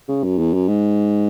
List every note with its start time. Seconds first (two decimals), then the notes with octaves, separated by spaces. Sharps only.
0.08 C#3
0.24 F#2
0.39 E2
0.54 F#2
0.68 G#2